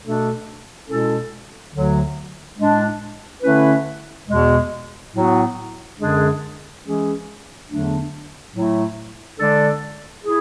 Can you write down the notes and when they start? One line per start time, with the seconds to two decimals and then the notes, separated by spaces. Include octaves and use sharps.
0.02 B2 A3 D4 A4
0.87 B2 G#3 C#4 E4 A4
1.72 D2 D3 F#3
2.58 A2 G#3 D4
3.43 D3 A3 C#4 E4 B4
4.28 E2 B2 G#3
5.13 A2 F#3 B3 F#4
5.99 F#2 D3 G#3 D4 G#4
6.84 E3 G#3 C#4 G#4
7.69 E2 D3 F#3 A3 D4
8.54 A2 F#3 A3 E4
9.40 D3 G#3 D4 A4 D5
10.25 E4 G#4